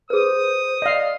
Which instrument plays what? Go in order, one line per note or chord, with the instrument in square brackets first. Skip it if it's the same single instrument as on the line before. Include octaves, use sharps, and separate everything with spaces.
[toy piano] G#4 B4 [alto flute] C5 [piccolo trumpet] D#6
[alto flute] D5 [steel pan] D#5 F5